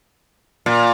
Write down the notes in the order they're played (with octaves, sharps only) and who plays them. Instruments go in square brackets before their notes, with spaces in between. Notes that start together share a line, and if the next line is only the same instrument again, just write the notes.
[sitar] A#2